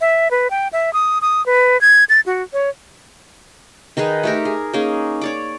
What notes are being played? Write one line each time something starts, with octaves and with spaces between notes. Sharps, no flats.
E5
B4
G5
E5
D#6
D#6
B4
G#6
A6
F#4
C#5
D#3 D#4 G#4 B4
A3 G4 A#4
G#4
A#3 C#4 D#4 G#4
C#5 D5 D6